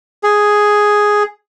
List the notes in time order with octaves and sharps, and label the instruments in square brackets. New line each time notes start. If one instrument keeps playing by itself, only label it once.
[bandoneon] G#4